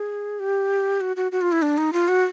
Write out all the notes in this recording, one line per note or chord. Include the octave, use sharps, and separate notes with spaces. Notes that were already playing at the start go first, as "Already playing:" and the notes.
Already playing: G#4
G4
F#4
F#4
F#4
F4
E4
D4
D#4
F4
F#4